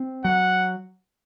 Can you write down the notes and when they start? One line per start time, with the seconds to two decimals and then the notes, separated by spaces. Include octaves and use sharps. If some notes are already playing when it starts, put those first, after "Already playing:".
Already playing: C4
0.24 F#3 F#5